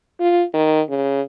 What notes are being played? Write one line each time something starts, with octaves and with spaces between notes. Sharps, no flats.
F4
D#3
C#3